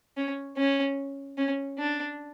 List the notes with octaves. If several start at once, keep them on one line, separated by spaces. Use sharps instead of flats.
C#4
C#4
C#4
D4